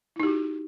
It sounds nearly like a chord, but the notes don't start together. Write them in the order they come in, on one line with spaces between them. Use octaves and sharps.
E4 D#4 G4 F#4